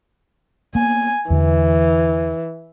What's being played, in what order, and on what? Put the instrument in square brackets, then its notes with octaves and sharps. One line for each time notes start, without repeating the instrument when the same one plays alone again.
[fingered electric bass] A#3 B3 [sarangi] G#5
[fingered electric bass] E2 D3 [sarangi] E3